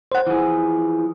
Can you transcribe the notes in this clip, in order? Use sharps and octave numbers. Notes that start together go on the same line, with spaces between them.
C5 F#5
E3 F3 G#4